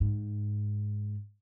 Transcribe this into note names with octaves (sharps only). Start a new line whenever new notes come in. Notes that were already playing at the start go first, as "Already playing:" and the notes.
G#2